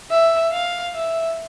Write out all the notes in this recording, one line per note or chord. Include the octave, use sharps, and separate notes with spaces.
E5
F5
E5